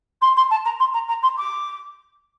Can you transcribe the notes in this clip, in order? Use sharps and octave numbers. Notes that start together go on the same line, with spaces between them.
C6
C6
A5
A#5
C6
A#5
A#5
C6
D6